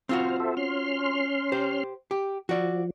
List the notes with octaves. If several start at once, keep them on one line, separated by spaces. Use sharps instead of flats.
C4 F4 F#4 C5 F6
A4 C5 E5
C#4 C6 F6
G4 C5
G4
F3 F#4 D5